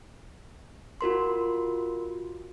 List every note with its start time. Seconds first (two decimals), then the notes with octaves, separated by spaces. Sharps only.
1.01 F4 F#4 A#4 C6